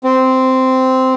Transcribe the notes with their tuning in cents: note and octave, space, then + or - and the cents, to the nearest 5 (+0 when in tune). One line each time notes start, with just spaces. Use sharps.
C4 -10